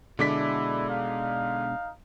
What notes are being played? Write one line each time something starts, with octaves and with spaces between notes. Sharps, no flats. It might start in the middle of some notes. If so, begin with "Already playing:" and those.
B2 D3 G#3 D4 E4 D6 B6
D#4 F5